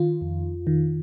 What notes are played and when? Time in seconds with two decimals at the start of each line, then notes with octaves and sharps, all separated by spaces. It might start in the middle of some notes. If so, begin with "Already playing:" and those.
Already playing: D#3 F4
0.22 F2
0.67 D#3